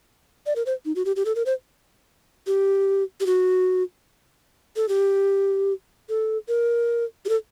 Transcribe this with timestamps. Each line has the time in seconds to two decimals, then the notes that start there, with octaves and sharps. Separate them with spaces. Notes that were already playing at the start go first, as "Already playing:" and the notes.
0.46 D5
0.56 A#4
0.66 C5
0.85 D#4
0.96 F#4
1.05 G4
1.16 G4
1.25 A4
1.36 A#4
1.46 C5
2.47 G4
3.20 G4
3.27 F#4
4.76 A4
4.89 G4
6.09 A4
6.48 A#4
7.25 G4
7.29 A4